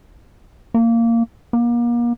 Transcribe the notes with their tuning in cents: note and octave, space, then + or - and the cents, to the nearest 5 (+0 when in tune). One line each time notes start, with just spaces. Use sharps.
A#3 -15
A#3 +35